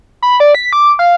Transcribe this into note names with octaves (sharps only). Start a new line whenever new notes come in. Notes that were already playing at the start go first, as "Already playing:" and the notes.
B5
D5
B6
D6
F5